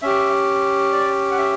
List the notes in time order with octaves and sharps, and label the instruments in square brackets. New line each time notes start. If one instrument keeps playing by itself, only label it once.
[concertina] C#4 G4 E5
D5
F#5
E5